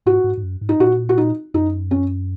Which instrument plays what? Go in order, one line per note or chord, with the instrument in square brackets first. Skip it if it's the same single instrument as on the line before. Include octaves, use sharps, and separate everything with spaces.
[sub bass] G#2 [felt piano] F#4
[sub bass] G#2
G#2
F#2
G#2
[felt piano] D#4
[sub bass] A#2 [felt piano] F#4
[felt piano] F#4
D#4
[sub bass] F#2 [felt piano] D#4
[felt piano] C#4